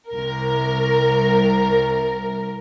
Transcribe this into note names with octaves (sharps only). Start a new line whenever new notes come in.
C2 A#4